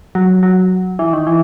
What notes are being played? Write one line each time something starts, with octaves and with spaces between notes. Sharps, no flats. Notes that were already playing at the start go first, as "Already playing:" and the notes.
F#3
F#3
E3
D#3
E3